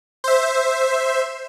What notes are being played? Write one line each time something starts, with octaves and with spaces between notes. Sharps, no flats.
C5 E5